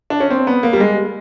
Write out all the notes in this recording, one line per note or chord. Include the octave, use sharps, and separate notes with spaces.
D4
C#4
C4
B3
A#3
G3
G#3